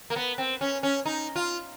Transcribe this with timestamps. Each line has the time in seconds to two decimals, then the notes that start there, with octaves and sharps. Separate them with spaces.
0.10 A#3
0.16 B3
0.38 C4
0.61 C#4
0.83 C#4
1.06 D#4
1.36 F4